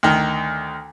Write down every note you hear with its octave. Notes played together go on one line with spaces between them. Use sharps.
D2 D#3